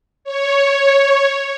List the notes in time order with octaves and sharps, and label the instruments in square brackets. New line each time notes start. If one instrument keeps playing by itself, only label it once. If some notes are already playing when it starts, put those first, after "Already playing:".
[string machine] C#5